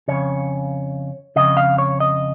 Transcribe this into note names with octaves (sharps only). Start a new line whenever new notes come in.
F2 C#3 C#5
F2 C#3 D#5
F5
C#5
D#5